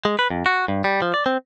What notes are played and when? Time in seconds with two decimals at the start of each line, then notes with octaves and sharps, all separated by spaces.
0.05 G#3
0.19 B4
0.30 F2
0.46 F#4
0.68 G2
0.84 G3
1.02 F3
1.14 D5
1.26 C4